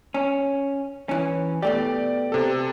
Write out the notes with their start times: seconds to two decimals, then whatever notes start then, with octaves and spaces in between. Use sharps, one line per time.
0.14 C#4
1.09 E3 C#4
1.62 B2 A3 G4 D5
2.32 C3 A4